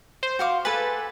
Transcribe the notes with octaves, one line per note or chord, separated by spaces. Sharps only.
C5
F#4 F5 D6
A4 B4 G#5 A6